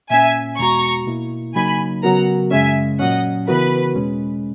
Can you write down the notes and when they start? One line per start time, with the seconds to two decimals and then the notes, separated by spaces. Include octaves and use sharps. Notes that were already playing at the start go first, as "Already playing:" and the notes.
0.10 A#2 A#3 C#4 E5 G#5
0.59 E2 B2 G#3 B3 F#4 A#5 C#6
1.07 B2 A#3 E4
1.55 C#3 F#3 A#3 D#4 G#5 B5
2.03 C#3 F#3 B3 F#4 A#4 F#5 A#5
2.51 F#2 C#3 G#3 C#4 E5 G#5
3.00 A#2 F#3 C#4 D#5 F#5
3.48 C#3 E3 B3 F#4 A#4 B4
3.95 E2 B2 G#3 C#4